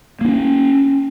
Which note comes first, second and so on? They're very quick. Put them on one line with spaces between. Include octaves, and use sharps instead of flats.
A#3 D4 C#4